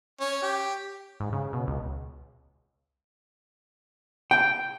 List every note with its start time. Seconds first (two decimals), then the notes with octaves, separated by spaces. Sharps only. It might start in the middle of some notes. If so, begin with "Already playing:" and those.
0.20 C#4
0.42 G4
1.20 G#2
1.33 C#3
1.53 B2
1.67 C#2
4.31 G5